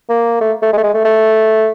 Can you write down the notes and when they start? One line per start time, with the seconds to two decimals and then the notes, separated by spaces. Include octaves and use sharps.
0.09 A#3
0.41 A3
0.62 A3
0.73 G#3
0.78 A3
0.83 G#3
0.94 A3
1.05 A3